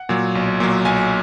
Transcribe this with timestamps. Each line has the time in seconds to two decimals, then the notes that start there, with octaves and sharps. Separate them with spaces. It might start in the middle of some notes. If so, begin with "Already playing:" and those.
Already playing: F#5
0.09 A#2 F#3
0.35 B1
0.60 A#2 F#3
0.85 B1 G#5